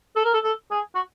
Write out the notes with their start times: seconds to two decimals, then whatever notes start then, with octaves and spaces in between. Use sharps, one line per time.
0.16 A4
0.25 A#4
0.34 A4
0.44 A4
0.71 G#4
0.95 F#4